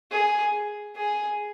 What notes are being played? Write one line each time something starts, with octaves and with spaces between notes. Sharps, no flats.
G#4
G#4